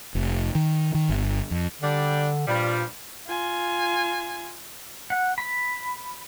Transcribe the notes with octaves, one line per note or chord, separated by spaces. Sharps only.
F1
D#3
D#3
G1
F2
D3 G3 D4
G2 A#2 F3 G3
F4 G#5
F#5
B5